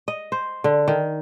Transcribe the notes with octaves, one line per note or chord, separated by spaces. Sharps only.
D#5
C5
D3
D#3